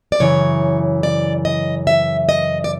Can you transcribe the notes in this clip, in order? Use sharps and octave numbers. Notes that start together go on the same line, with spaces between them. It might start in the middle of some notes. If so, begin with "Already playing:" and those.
D5
F#2 C#3 E3 C#5
D5
D#5
E5
D#5
D5